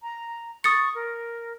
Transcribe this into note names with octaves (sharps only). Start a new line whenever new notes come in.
A#5
C#6 D#6 A6 C#7
A#4